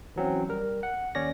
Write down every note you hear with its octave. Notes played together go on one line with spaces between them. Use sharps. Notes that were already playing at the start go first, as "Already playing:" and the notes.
E3 F#3 C4 C#4
G3 A#4
F#5
D#2 C#4 C#5 D5 A#6